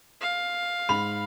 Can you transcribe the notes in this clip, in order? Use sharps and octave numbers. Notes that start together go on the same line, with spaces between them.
F5
G#2 B5 F7